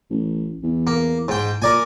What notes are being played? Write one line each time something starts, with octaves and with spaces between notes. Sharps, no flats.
A1
E2
A#3
G#2 G5
A#2 A#4 D5 G#5